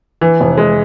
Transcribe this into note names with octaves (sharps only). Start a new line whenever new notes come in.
E3
F1
G#3